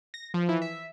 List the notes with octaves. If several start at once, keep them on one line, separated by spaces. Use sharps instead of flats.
A#6
F3
E3
E5